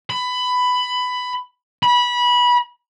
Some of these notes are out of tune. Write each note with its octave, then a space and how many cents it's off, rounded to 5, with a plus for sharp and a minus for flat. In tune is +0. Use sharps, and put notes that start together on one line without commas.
B5 +15
B5 -20